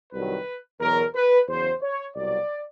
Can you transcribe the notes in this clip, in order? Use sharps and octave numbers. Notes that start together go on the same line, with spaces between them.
C2 C3 D#3 F#3 B4
E2 B2 F#3 A#4
B4
E2 C#3 F#3 C5
C#5
C2 B2 F#3 D5